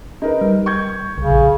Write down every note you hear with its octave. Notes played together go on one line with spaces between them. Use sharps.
D#4 A#4 B4
G3
C#6 G6 G#6
C2 C#3
A#1